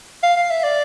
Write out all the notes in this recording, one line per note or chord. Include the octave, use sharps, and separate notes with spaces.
F5
F5
E5
D5